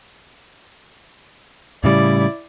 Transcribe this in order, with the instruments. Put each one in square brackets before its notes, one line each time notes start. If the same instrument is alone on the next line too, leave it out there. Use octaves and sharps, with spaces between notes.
[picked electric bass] A2 C#3 G3 [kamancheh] E4 D5